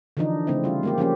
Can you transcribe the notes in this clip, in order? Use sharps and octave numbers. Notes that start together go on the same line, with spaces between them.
D3 E3 F3 D4 D#4
C#3 A3 C4 D4 E4
G3 F4
G#3 A#3 G4
F3 A#3 C#4 G4